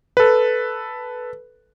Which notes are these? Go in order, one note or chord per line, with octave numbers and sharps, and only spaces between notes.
A4 B4